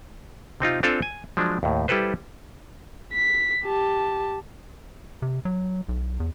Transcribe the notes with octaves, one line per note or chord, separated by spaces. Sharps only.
C3 C4 D#4 F4
C4 D4 F4 A4 F5 G#5
G#5
F3 F#3 G#3 D4
D#2 A2
G3 E4 G4 A4 B4 C5
B6
G4 A5
C3
F#3
B1
E2